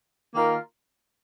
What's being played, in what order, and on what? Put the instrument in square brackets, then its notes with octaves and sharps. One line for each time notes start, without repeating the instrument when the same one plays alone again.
[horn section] D#3 A#3 F4 A#4